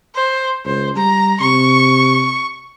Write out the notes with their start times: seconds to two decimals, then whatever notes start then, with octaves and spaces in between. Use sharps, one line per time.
0.15 C5
0.65 C#2 C5
0.96 G3 A#5
1.40 C3 C#6